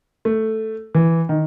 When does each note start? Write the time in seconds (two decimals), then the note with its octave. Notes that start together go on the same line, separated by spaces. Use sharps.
0.25 A3
0.94 E3
1.29 D#3